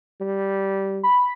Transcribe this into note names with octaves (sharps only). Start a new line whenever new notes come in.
G3
B5